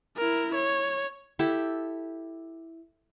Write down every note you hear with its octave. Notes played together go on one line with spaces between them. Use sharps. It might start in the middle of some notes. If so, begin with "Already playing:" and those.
E4 A#4
C#5
E4 G4 A4